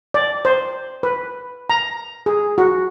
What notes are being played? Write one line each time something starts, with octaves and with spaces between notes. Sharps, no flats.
D5
C5
B4
A#5
G#4
F#4